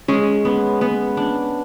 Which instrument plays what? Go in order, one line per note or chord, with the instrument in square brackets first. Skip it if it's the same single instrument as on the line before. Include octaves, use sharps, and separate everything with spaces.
[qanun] G#3 [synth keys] C#4
[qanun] B3
B3
D4